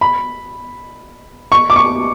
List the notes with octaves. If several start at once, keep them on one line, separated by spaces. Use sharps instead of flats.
B5
C#6
D6
C#6